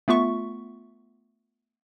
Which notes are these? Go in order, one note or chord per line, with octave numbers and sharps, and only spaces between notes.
A3 B3 F4 E5 C#6